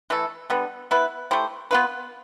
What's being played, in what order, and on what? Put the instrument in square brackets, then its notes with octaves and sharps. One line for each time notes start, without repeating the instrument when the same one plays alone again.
[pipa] E3 A3 E4 A4
D3 G3 B3
B3 E4 B4
A3 E4 G4 C5
B3 F4 B4